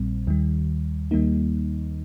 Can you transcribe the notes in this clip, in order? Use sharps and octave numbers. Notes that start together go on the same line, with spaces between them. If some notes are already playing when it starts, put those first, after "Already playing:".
Already playing: A#1 A#2 G3 C4
D#2 D#3 G3
D#2 D#3 G3 A#3 D#4